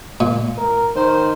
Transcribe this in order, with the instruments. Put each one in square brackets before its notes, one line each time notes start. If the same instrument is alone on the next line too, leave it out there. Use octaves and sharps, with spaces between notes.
[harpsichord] A#2
[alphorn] A#4
[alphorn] D#3 [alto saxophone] C5